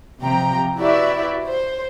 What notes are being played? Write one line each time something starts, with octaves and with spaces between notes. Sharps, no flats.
C3 F3 G5 A#5
E4 F#4 G4 B4 D5 E5
C5